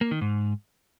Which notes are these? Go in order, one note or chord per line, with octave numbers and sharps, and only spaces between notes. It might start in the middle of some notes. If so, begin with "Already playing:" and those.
A#3
D#3
G#2